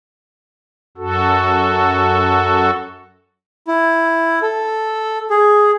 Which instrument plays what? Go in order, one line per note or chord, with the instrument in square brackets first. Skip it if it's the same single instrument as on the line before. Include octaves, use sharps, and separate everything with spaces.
[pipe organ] F#2 F#4 A4
[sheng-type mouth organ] E4
A4
G#4